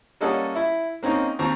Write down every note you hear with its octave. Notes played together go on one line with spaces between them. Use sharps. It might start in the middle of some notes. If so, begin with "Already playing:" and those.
G3 A#3 C#4 A4 D#5 F#5
E4
A#3 C4 C#4 D#4
D#2 C4 A5 A#5 C#6